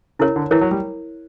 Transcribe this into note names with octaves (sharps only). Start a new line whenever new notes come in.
C#3 E4 A#4 C#5
D3
E3 E4 A#4 C#5
F#3
G3